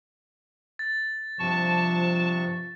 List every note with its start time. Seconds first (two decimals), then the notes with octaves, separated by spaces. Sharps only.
0.79 A6
1.39 G2 C3 F3 A5 C#6